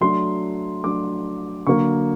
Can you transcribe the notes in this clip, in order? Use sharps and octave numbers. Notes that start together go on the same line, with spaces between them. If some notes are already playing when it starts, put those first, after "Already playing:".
F#3 A3 D4 C6
F#3 A3 D4 D6
D3 F#3 A#3 C#6